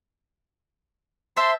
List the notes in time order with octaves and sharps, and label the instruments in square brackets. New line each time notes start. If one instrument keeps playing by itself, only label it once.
[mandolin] C5 E5 A5 [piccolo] C6